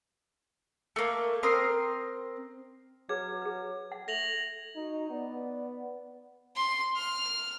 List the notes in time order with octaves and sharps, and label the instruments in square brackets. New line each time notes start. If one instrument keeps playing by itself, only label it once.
[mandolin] A3 A#3
C4 A#4 C6 D#6
[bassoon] F#3 [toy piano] G#4 B4 [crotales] G#6
[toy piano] G#4 B4
F#5
[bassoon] A3 [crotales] A#6 F7 F#7
[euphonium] D#4 [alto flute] F#4
[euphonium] B3 [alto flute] D5
[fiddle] C6
F6